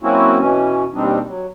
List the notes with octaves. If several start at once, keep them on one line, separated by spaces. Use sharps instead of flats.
F#3 A#3 C4 C#4 E4 F#4
B2 E3 C#4
D#2 B2 G3 C4 D4 D#4
F#3